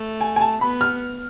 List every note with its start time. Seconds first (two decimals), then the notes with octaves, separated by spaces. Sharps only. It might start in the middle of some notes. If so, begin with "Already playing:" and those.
Already playing: A3
0.21 G#5
0.36 G#5
0.41 A5
0.61 B3 B5
0.81 F6